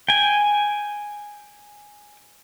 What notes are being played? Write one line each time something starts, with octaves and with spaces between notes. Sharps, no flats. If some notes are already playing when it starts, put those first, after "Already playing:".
G5 G#5